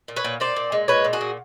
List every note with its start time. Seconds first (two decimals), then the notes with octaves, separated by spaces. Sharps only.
0.08 A#2
0.16 B4 C#5
0.24 A#2
0.40 A#2 C5 D5
0.56 A#2
0.72 G#3
0.88 A#2 B4 C#5
1.05 A#2
1.13 F#4 G#4
1.21 A#2